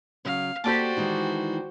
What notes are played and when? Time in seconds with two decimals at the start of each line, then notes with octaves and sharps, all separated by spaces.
0.25 C#3 F#3 F5
0.64 A#3 C4 F#4 G4 A4 C5 D5 A5
0.97 D#3 E3 G#3